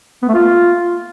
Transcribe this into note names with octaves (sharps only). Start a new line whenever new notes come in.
B3
A3
F4